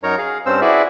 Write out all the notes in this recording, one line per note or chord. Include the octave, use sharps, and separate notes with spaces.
F#2 D#4 A#4 C#5 A#5
G#4 F5
G2 C4 C#4 C5 E6
E4 F#4 G#4 B4 D5 E5